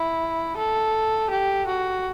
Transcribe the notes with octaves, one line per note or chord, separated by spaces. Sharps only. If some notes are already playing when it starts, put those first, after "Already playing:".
Already playing: E4
A4
G4
F#4